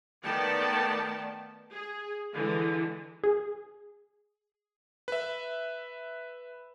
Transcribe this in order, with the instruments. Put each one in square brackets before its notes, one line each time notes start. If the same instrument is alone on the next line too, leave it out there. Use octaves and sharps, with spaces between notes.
[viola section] D#3 A3 B3 D5 G5 A5
G#4
D3 E3 G#3
[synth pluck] G#4
[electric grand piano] B4 E5